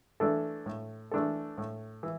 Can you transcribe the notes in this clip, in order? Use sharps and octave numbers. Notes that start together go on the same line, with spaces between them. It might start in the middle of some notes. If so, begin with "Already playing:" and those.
E3 A3 D4 A4
A2
E3 A3 D4 A4
A2
E3